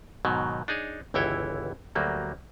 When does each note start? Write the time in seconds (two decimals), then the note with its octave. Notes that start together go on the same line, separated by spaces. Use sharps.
0.25 G#2 B2 D#3 F#3
0.68 D4 D#4 G#4 C#5
1.14 G1 C#2 E3 E4 C#5 G5
1.95 D2 F#3 G3 A#3